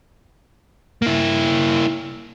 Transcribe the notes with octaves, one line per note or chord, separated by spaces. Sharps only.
A#3 E4